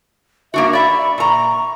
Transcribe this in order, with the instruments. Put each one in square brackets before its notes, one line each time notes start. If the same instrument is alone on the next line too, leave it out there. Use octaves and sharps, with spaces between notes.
[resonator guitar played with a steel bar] A#3 D4 F#4 [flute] E5
[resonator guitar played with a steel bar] D5 E5 [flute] B5
[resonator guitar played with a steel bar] A#2 A#5 [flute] C#6